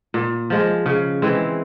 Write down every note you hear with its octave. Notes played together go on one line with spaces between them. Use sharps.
A#2
F3 G#3
C#3
E3 G#3 C4